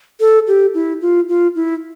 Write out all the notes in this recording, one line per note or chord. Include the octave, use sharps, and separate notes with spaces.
A4
G4
E4
F4
F4
E4